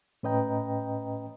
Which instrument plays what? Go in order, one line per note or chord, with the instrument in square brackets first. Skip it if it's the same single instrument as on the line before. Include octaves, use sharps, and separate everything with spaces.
[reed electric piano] A2 C#4 B4 D#5 G5 A#5